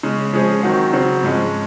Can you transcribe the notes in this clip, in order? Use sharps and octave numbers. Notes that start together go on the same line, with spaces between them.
C#3 G#3 C#4
F3 G#3 C#4 G#4 C5
D#3 F#3 C4 F#4
C#3 F#3 C4
G#2 F3 G#3 C#4